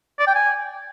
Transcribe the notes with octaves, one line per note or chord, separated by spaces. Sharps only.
D5
G5
G#5